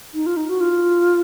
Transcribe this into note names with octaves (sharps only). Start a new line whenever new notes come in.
D#4
F4
D#4
F#4
F4